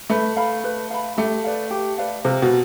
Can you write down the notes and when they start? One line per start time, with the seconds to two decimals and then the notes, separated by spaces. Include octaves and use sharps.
0.10 A3 B4
0.37 F5 B5
0.64 B4
0.90 F5 B5
1.17 A3 G4
1.44 B4 D5 F5
1.71 G4
1.98 B4 D5 F5
2.25 C3 F4
2.42 B2